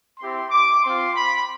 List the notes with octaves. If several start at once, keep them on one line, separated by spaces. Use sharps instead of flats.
C4 E4 G4 C6
D6
C4 F4 C6
B5